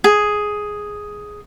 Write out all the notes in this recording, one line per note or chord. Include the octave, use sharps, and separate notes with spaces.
G#4